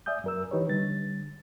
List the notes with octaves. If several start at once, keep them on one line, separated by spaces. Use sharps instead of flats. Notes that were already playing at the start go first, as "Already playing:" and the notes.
D5 E5 G#5 D#6 G6
F#2 A#4 E6
E3 D#4 G4 B4 C#5
D3 G3 A6